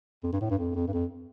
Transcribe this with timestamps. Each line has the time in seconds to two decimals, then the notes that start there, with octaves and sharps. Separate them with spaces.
0.24 F2
0.33 G2
0.41 A2
0.50 G2
0.59 F2
0.75 F2
0.88 G2
0.93 F2